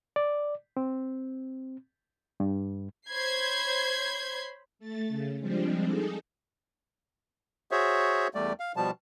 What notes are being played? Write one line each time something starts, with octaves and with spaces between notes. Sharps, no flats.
D5
C4
G2
C5 C#5 B5 G6 G#6 C7
A3 A6
C#3
F3 G3 G#3 C4 D4
D#4 G#4 A4
F#4 G#4 C5 C#5 E5
E2 G3 A3 D5
F5
B2 F3 G3 A5